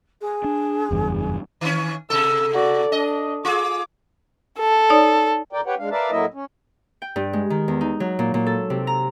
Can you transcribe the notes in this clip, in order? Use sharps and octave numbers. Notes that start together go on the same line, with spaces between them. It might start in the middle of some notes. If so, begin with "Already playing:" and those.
G#4
D4
F#1 E2 G2
D#3 C#4
C3 A4 E6
F#4 D5
D4 D#5
F4 G#4 D6
A4
D#4 C#5 D5
F2 A#4 D5 G5
G4 B4 C#5 F#5 G5
G#3 D4 F5
A#4 B4 D5 E5 F5 A5
A2 F#3 A#3 E4 D#5 E5
C#4
G5
G2
G#3
D#3
E2
D#4
F#3
A#2
A#2
A4
C3
A#5